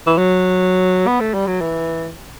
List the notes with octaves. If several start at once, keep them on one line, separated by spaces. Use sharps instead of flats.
E3
F#3
B3
A3
G3
F#3
E3